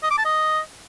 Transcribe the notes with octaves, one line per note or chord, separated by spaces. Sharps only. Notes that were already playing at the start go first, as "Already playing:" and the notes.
D#5
D6
A5
D#5